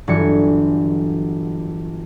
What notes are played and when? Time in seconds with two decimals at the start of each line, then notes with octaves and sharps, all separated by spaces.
0.08 G1 E3 F#3 D4 G#5 C#7